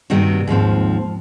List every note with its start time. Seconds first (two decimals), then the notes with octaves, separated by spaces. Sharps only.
0.10 G2 C3 D#3 G3 A#3 F#4
0.47 D#2 G#2 F3 C4